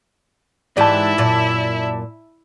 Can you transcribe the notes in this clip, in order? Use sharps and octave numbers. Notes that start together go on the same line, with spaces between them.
G#2 E3 E4 G4 D5 E5 A5
F#2 A#2